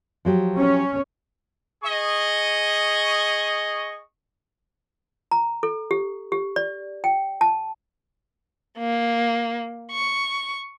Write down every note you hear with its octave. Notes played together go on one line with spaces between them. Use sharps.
F3 F#3 G4
C#4
G#4 D#5 C#6
A#5
A4
G4
G4
D5
G5
A5
A#3
C#6